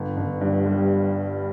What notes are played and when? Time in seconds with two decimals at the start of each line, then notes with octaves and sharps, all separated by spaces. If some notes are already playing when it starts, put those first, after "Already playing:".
Already playing: G1
0.17 G1
0.41 G2
0.66 G3